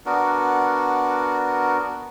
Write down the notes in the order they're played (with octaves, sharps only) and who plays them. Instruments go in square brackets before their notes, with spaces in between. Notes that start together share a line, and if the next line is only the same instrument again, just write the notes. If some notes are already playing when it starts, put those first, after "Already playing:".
[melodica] B3 D4 F#4 A#4